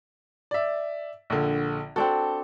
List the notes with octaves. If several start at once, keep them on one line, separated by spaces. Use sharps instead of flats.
D5 E5
A#1 D3
C4 D4 F#4 A4